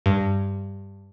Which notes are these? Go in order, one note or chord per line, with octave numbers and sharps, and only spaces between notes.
G2